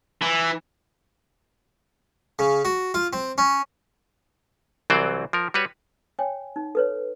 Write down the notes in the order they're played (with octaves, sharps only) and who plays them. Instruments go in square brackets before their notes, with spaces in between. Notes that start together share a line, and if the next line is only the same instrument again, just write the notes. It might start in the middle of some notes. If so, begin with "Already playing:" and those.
[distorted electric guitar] E3
[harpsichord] C#3
F#4
F4
C4
C#4
[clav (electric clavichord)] C2 E3 F#3 C4 C5 D5
F3 A#4
G3 F#4 B4 C#5
[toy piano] C#5 G5 G#5
D#4
A4 B4 C#5